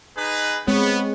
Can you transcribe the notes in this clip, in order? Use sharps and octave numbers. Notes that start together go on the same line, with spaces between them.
D#4 G#4 B4
G#3 B3 C4 C#5